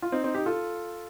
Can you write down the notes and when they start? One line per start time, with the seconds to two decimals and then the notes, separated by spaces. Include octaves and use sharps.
0.02 F4
0.12 C4 D#4
0.24 C4 D#4
0.34 D#4 G4
0.46 F4 A4